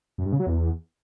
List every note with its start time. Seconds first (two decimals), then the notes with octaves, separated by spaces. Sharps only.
0.18 F#2
0.25 G2
0.32 C#3
0.40 F#3
0.47 E2